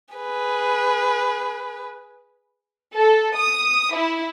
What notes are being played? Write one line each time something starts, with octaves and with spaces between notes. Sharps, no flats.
G#4 B4
A4
D#6
E4